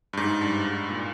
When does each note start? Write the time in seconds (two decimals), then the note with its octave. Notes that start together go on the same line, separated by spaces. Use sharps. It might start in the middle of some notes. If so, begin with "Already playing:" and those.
0.13 G2
0.17 G#2
0.41 G2
0.65 G#2
0.89 A#2